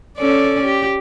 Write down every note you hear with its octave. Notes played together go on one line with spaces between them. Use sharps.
C#4 A4 D5
G4